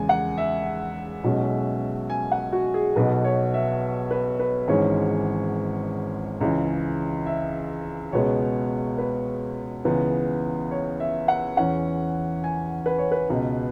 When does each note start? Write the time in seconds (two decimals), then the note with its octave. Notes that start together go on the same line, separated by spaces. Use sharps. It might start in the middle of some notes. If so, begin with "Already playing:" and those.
Already playing: E2 C#3 G#3 G#5
0.09 F#5
0.38 E5
1.24 B1 B2 G#3 C#4
2.10 G#5
2.32 F#5
2.52 F#4
2.74 G#4
2.96 B1 B2 B3 B4
3.24 C#5
3.54 E5
4.11 B4
4.39 B4
4.68 G#1 G#2 E3 G#3 C#4 C#5
6.41 C#2 C#3 E3
7.26 E5
8.12 C#2 B2 G#3 B3 C#5
8.98 B4
9.85 C#2 C#3 E3 B3
10.71 C#5
11.00 E5
11.28 F#5
11.57 E2 E3 C#4 F#5
12.44 G#5
12.86 B4
12.99 C#5
13.12 B4
13.30 C#2 B2 B3